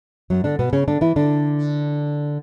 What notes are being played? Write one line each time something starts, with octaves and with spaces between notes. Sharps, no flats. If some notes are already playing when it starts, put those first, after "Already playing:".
F#2 F#3
D3 D4
B2 B3
C#3 C#4
D3 D4
E3 E4
D3 D4